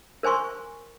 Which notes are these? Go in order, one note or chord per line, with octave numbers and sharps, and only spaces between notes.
A#4 C5 G#5 C6 C#6